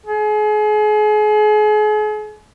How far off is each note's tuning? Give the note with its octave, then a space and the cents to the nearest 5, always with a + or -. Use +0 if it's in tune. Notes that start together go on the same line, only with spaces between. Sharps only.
G#4 +35